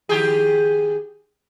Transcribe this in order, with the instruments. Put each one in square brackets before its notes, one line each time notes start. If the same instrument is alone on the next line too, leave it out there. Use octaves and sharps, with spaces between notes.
[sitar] D#3 G4 G#4